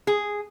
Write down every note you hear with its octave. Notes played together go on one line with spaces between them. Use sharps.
G#4